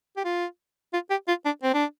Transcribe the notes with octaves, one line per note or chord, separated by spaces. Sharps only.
G4
F4
F4
G4
F4
D4
C4
D4